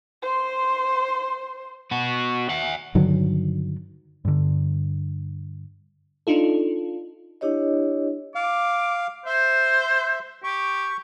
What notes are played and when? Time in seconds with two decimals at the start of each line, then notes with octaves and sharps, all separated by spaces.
0.22 C5 C6
1.91 B3 F#4
2.50 E5 F#5
2.95 G2 D3 D#3 F#3
4.25 G2 D3
6.27 D4 D#4 F4 A4
7.41 D4 E4 G4 C#5 D#5
8.35 F5 D6
9.26 C5 E5
10.44 G4 C#6